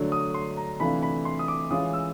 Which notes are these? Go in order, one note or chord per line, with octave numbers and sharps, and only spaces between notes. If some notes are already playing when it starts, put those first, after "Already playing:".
Already playing: D3 F#3 A3 D4
D#6
C6
A#5
C3 E3 A3 D4 F4 B5
B5
C6
D#6
D6
E3 G#3 C#4 F4 D#6
E6